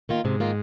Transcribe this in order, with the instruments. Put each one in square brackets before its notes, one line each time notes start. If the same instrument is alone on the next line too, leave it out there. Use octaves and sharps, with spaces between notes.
[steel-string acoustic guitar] D#3 A#3 F4
[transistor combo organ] G#2 [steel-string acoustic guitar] C3
[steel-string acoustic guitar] D#3 A#3 F4